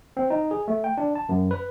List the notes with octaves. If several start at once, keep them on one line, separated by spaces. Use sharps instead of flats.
C4
D#4
G#4
A3
G5
D4
A5
F#2
B4